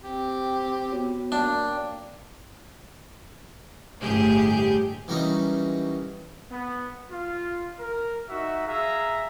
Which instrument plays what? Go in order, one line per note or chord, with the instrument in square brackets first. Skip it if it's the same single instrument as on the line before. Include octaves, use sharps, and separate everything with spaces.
[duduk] C4 [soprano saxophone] G4
[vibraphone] B3 F#4 C#5
[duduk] A#3 [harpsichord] D4 [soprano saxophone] G5
[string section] G1 A2 G4 G#4 G6
[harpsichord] E3 F#3 G3 A#3 C#4 D#4
[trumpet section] B3
F4
A#4
D#4 F#4 E5
G#4 E5 F5 A#5